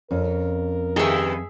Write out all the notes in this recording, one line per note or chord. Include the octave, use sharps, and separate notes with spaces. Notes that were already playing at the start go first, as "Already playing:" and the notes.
F2 C#4 A#4
G2 D#3 G#4 A4 E5